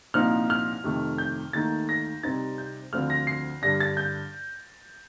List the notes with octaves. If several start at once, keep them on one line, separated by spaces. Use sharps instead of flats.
C2 A#2 F3 C4 D#4 F6
F6
F2 C3 D#3 A3
G6
D#2 D#3 A3 D#4 A6
A#6
C3 G3 C4 D#4 A6
G6
D2 D3 F3 C4 F6
A#6
C7
G2 D3 G3 D4 A#6
A6
G6